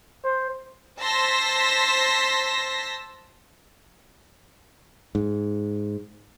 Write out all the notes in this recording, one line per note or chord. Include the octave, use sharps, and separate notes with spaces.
C5
C5 A5 C6 E6 A#6 B6
G#2